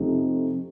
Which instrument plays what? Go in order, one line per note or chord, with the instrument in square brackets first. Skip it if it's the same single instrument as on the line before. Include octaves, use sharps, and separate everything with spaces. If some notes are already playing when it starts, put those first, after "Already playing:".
Already playing: [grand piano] F2 C3 F3 A3 D#4